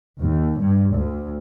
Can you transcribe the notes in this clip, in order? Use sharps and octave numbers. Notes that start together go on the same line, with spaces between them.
D#2
G2
D2